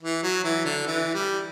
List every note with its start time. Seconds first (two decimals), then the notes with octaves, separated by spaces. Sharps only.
0.02 E3
0.23 F#3
0.44 E3
0.65 D3
0.87 E3
1.14 G3